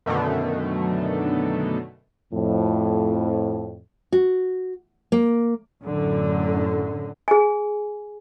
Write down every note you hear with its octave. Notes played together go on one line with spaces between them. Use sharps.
F#2 B2 D3 D#3 A3
F2 A2
F#4
A#3
F#2 A2 D3
G#4 G#5